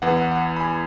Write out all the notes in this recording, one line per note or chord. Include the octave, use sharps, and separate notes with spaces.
E2 E3 B3 F#5
F#5
F#5
B5
G#5